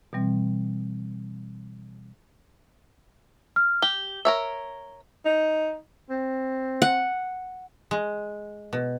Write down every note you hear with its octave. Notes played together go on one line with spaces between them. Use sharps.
B2 E3 G3 C4
F6
G4 G7
A#4 C#5 E5
D#4
C4
F#5
G#3
B2